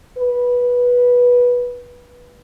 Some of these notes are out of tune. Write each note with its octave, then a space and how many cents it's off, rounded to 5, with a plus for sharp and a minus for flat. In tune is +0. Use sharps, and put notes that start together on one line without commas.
B4 -15